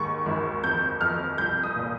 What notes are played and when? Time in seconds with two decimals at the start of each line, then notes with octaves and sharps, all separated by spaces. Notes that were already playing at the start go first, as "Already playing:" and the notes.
Already playing: D#2 G#2 C#6
0.26 G#1
0.64 F2 G6
1.01 F2 F6
1.38 C2 G6
1.63 D#6
1.76 A#2